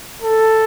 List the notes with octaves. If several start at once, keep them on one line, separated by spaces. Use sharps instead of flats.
A4